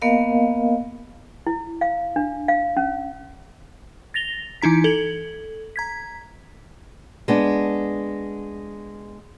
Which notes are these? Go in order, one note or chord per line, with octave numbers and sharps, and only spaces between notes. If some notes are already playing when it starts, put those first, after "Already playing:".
A#3 B3 A#4 D#5 F5
E4
F5
D4
F5
C#4
A6 A#6 F7 G7
E3 D#4 E4 A#5 B6
A4 G#6 F#7
A#5 G#6 B6
G#3 B3 D4